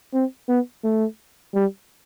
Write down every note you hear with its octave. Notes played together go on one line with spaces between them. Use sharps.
C4
B3
A3
G3